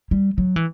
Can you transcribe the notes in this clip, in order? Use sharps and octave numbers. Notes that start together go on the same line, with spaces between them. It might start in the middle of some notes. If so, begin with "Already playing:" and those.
G3
F#3
E3